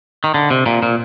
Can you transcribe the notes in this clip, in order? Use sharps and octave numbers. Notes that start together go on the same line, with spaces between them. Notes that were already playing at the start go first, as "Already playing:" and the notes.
D#3
D3
C3
A#2
A#2